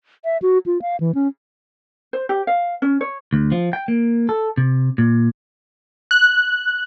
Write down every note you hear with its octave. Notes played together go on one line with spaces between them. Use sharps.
E5
F#4
F4
F5
E3
C#4
C5
G4
F5
C#4
C#5
D2
F3
G5
A#3
A4
C3
A#2
F#6